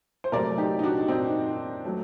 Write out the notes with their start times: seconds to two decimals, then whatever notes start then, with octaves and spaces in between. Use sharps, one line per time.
0.24 C5
0.32 C3 F#3 A3 A#4 D5
0.58 D#4 G4
0.79 D#4
0.83 D4 F#4
1.08 C4 D#4
1.85 F#3 A3